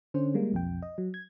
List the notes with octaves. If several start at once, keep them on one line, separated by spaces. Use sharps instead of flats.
D3 C#4 C5
G3 G#3 A#3
B1 F2 G5
D#5
F#3
G#6